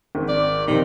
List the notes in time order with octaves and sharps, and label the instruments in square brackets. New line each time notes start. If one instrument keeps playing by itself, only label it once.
[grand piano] G#1
[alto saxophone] D5
[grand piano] C3 F3 [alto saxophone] D#3